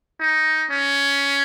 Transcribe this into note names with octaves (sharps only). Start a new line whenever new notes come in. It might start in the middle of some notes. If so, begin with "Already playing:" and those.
D#4
C#4